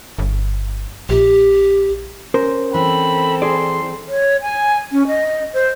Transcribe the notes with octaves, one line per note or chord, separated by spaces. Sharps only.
G1
A#1 G4
C#4 A#4 C5
E3 C4 A4 B5
G#4 D5 C6
C#5
G#5
C#4
D#5
C5